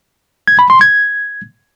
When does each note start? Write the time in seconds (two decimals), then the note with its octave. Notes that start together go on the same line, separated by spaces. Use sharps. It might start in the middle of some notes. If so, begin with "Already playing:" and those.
0.48 G#6
0.59 B5
0.70 C6
0.81 G#6